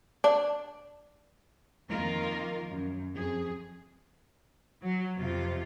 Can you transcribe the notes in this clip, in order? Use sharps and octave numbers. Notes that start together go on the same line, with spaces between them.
D4
F2 D#3 A#3 F4 A#4
F#2
F2 G#4
F#3
F2 C3 F4